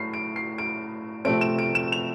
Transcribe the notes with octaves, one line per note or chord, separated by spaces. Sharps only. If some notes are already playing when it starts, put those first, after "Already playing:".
Already playing: A2 C7
D7
C7
D7
C3 F3 A3 C4 D7
E7
D7
E7
F7